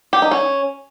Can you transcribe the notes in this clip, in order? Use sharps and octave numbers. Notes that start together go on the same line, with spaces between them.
G4
D#4
C#4